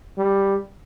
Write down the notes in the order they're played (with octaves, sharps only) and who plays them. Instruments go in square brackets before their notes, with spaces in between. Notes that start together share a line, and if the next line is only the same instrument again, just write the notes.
[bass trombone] G3